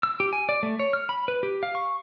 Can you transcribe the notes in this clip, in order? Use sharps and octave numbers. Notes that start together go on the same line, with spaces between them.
E6
G4
G#5
D5
A3
C#5
F6
B5
B4
G4
F5
C#6